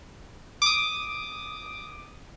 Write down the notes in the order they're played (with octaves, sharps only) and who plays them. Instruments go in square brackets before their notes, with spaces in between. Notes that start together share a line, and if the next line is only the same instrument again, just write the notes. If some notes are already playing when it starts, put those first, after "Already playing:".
[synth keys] D6 D#6